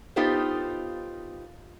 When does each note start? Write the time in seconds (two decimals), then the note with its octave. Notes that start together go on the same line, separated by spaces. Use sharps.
0.16 B3 D#4 F4 G4 A4 C5